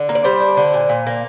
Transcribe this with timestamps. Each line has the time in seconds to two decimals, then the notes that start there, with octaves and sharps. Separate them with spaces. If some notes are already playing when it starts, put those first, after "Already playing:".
Already playing: D3
0.09 A#3
0.15 D5
0.24 G3 C5
0.40 D4
0.57 D3
0.74 A#2
0.89 A#2
1.06 A#3